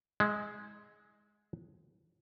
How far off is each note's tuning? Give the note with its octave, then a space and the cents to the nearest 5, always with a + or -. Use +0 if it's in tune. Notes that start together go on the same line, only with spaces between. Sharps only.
G#3 +0 E4 -35 F#5 -25